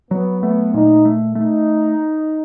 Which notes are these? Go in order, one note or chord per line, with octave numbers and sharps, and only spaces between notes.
F#3 B3
A3 B3
A#2 D#4
A3
A3 D#4